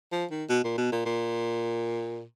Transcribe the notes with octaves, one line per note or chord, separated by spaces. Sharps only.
F3
D#3
B2
A#2
B2
A#2
A#2